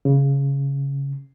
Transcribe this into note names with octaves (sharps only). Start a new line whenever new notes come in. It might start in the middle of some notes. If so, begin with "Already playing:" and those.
C#3